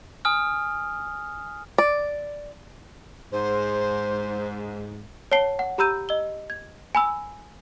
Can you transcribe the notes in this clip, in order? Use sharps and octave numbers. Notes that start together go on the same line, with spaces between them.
G#5 D#6 F6
D5
G#2 C5
C#5 F#5 A5 C7 G7
F#5
G4 A#5 B5 E6 G6 D#7
D#5 E6 G7
G#6
G#5 B5 E6